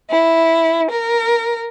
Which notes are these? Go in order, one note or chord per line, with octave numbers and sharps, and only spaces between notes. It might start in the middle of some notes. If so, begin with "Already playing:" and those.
E4
A#4